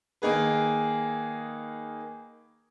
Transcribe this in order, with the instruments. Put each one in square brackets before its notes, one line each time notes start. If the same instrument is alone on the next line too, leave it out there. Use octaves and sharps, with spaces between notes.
[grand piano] D#3 A#3 D#4 G#4 B4